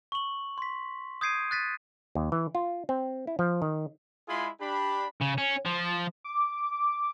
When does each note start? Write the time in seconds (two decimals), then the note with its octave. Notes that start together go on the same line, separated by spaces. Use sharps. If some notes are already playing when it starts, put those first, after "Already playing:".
0.12 C#6 F#7
0.58 C6 B6
1.21 D#6 G6 G#6 C7 D7 D#7
1.51 F#6 A6 B6 D#7
2.15 D#2
2.32 E3
2.55 F4
2.89 C4
3.27 E4
3.39 F3
3.62 D#3
4.29 G#3 E4 F4 G#4 B5 C6
4.60 D4 G4 B5
5.21 C#3
5.38 C#4
5.65 F3
6.24 D6